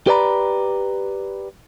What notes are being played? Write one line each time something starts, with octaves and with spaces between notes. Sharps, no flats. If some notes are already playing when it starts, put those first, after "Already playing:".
G4 B4 D5 A#5 B5